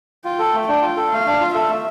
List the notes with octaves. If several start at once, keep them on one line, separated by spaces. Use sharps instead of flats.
F4 G5
A4
A3
D4 G5
F4
A4
A3 F5
D4
F4
A4 E5
A3